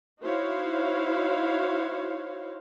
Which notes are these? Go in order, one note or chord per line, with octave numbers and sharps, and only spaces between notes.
D#4 E4 F#4 C5 C#5 F5